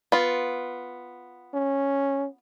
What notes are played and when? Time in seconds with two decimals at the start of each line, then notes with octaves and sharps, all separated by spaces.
0.12 B3 F4
1.54 C#4